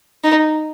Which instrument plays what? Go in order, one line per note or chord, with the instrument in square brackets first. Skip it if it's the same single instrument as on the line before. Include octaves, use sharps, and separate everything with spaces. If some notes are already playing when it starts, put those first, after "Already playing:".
[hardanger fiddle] D#4